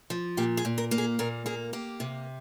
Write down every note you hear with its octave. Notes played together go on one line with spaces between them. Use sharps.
F3
A#2 G4
G#4
A#2
A#4
A#3
G#4
A#2 A#4
A#3 G#4
A#3 G4
C3